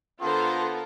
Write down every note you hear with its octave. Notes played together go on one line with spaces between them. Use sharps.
D3 B3 F4 A4 A#4 C5 C6